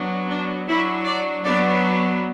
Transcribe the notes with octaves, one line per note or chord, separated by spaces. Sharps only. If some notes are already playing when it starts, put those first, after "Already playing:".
Already playing: F#3 B3 D4
D4
F#3 D4 E4
D5
F#3 B3 D4 D5